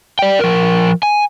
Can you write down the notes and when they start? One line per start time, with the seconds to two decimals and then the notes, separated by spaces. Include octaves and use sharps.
0.19 D5 G5
0.40 F3 A#4
1.03 G#5